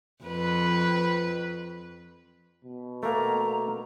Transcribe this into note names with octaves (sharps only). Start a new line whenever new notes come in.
F2 B4
B2
A3 A#3 A#5